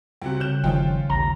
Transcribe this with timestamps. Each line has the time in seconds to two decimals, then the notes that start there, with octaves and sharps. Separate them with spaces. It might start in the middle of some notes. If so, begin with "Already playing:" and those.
0.22 C#2 C3 G3 F#4
0.40 C#3 F#6 G6 E7
0.64 G1 D#3 F3 C#4 F4 G5
1.09 A1 D#2 A#5